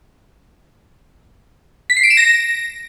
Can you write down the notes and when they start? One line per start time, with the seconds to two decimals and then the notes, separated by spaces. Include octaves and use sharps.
1.90 B6
1.97 C7
2.03 D7
2.10 E7
2.17 A#6